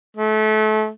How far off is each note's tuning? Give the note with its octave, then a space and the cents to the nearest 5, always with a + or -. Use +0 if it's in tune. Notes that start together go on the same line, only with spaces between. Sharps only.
A3 -30